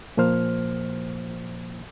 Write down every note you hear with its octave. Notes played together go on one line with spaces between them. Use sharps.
A#2 F3 A#3 C5 F6